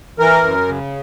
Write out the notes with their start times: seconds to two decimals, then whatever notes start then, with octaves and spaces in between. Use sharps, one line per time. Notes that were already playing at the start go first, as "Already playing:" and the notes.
0.19 E3 A#4
0.43 F#2
0.68 C#3